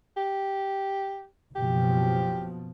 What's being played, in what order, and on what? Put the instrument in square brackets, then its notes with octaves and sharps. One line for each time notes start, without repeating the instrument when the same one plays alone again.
[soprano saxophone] G4
[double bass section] F#1 B2 F3 [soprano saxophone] G4